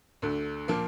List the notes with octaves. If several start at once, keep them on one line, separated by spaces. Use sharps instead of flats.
D2 D3 A3
A#2 F3 A#3